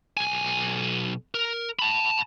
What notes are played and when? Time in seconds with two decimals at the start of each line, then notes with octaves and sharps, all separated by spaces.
0.17 B1 G#5
1.35 A#4
1.79 A5 B5